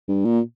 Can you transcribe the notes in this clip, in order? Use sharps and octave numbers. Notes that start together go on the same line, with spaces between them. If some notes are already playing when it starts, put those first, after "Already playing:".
G2
A#2